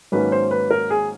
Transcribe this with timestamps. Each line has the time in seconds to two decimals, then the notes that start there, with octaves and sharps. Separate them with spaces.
0.12 G#2 D#3 F#3 A#3 C#4 B4
0.32 C5
0.51 B4
0.70 A#4
0.90 G#4